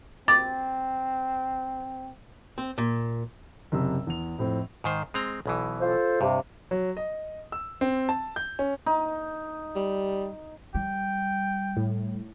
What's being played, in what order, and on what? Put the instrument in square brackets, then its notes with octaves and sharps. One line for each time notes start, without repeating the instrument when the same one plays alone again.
[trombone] C4 [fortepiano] D6 [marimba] A6
[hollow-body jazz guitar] C4
A#2
[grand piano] F#1 C3 E6
E2 F7
F2 A2 C4
[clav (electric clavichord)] G#2 D#3 C5
G#3 C4 A#5
B1 B2 E3
[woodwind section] F4 A4 C5
[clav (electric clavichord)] G2 [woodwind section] C3
[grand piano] F#3
D#5
E6
C4
A5
G6
C#4
[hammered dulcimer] D#4
[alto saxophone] G3
[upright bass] G3 [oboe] G5
[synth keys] A2